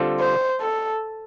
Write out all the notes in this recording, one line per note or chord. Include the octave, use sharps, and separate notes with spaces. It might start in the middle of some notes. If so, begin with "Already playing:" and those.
Already playing: D3 G3 C4 F4 A4
C5
A4